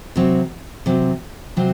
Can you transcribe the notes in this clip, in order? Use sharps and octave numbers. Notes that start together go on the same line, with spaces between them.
C3 F#3 C4
C3 F#3 C4
C3 F#3 C4